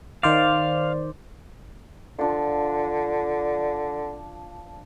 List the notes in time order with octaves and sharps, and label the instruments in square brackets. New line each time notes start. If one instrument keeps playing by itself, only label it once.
[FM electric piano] D#3 C5 D5 [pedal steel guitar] F5
[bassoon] D3 [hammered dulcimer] F3 D4 F4